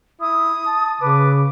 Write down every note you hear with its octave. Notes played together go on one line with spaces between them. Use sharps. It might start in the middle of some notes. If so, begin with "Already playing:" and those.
E4 D#6
A5
C#3 B4 D6